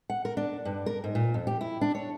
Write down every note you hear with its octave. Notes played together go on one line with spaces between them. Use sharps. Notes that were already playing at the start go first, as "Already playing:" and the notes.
F#5
A#4
D4
G2
A#4
G#2
A#2
F2
G4
E4
D4
C#5